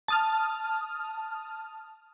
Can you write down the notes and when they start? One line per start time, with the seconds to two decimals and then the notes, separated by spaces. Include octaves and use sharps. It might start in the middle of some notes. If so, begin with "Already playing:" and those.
0.08 A5 D#6 F6